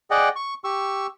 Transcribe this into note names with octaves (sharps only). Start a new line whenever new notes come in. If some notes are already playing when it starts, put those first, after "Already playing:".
G#4 D5 D#5 F#5 G5
C#6
G4 C#6 E6